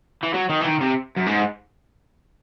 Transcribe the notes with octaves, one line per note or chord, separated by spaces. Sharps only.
E3
F#3
D#3
E3
D#3
C3
F#2
G#2